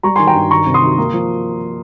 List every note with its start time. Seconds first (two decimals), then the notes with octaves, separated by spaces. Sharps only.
0.03 G3 A#5 C#6
0.16 G#5 C6
0.19 D#3
0.27 G5 A#5
0.35 G2
0.51 D#3 A#5 C#6
0.67 C3
0.74 C6 D#6
0.82 D#3
0.98 A#3
1.14 F3